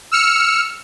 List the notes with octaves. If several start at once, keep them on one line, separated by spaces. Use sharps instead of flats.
E6 F6 C#7